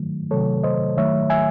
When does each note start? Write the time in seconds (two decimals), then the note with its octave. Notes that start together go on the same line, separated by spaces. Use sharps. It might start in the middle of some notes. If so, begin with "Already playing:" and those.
Already playing: D#3 F#3 A3
0.30 C3 D#3 F#3 A3 A4 C#5
0.63 C5 D#5
0.97 D#3 F#3 A3 C#5 E5
1.30 E5 G#5